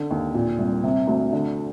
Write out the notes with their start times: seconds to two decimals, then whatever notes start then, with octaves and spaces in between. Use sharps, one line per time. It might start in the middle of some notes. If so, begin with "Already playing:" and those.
Already playing: D3
0.11 D#2
0.34 A#2
0.59 C2
0.84 C3
1.07 D2
1.33 D3